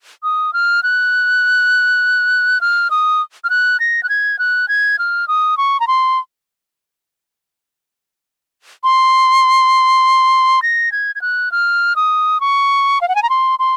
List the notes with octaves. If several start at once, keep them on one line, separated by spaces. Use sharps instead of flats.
D#6
F6
F#6
F6
D#6
F6
F#6
A#6
F#6
G#6
F#6
G#6
F6
D#6
C#6
A#5
C6
C6
A#6
G#6
G#6
F#6
F6
D#6
C#6
F5
F#5
G#5
A#5
C6
C6